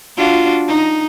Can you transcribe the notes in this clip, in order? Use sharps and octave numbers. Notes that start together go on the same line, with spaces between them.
D4 F4 F#4
D#4